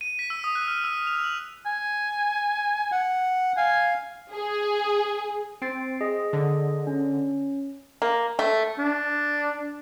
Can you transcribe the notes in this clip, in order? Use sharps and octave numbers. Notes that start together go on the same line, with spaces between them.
D#7
B6
E6
D#6
F#6
F6
E6
F7
F#7
G#5
F#5
F5 G#5
G#4
C4 A6 C7 D7
G#4 D#5
D3
C#4
A#3
A3
D4